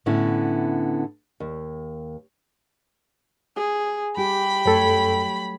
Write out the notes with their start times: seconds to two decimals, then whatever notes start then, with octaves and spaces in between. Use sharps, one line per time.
0.06 A2 D3 B3 C#4 E4
1.40 D#2
3.56 G#4
4.17 G3 G4 G5 B5
4.66 F#2 F#3 A3 A4 C#5